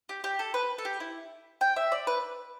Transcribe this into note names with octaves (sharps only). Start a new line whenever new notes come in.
G4
G4
A4
B4
A4
G4
E4
G5
E5
D5
B4